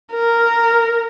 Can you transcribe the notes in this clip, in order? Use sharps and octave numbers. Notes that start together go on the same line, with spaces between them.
A#4